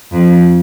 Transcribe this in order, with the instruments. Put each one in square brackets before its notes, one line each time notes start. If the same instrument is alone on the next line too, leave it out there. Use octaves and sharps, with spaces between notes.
[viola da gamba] F2